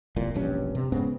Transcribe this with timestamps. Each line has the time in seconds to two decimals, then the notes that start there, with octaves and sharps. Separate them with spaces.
0.16 D1 C2 A#2
0.34 E1 A#1 G2 C#4
0.75 C3
0.92 G#2 C#3 B3 C4